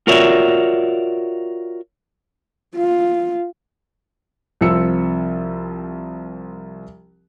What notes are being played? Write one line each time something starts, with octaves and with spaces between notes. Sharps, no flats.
F4 F#4 A#4 C#5 D5 E5
F4
C2 F3 C4 E6 C#7